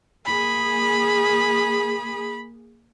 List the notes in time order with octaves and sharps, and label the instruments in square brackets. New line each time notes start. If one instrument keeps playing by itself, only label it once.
[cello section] A#3 G#4 [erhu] B5